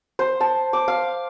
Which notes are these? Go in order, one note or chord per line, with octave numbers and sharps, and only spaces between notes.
C5
A5
D6
F5